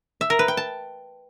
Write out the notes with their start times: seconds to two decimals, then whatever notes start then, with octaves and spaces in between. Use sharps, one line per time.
0.21 E5
0.30 A#4
0.39 B4
0.48 G5
0.57 A5